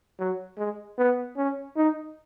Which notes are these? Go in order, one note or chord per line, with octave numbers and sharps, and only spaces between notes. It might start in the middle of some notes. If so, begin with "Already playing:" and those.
F#3
G#3
B3
C#4
D#4